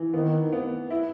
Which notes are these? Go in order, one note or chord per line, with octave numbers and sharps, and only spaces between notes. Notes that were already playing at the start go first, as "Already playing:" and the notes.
Already playing: E3
D#3 B3
B3
E4